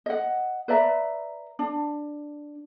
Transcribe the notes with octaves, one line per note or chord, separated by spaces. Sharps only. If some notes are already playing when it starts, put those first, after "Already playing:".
D#5 F#5
B4 D5 E5 A#5
D4